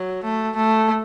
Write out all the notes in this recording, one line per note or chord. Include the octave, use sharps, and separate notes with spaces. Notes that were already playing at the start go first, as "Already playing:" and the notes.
Already playing: F#3
A3
A3